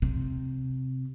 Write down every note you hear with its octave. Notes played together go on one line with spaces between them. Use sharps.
C3